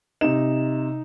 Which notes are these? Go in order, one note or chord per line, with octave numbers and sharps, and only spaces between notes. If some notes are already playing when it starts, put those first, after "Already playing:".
C3 D#4 E7